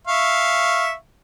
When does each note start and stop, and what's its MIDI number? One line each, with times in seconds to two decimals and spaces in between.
0.07 0.93 76
0.07 0.93 77
0.07 0.93 85